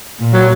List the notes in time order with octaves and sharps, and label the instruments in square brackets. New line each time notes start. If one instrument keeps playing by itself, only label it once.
[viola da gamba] A#2
[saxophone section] F#3